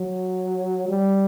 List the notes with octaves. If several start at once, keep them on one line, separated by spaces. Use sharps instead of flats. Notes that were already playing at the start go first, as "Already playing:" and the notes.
Already playing: F#3
G3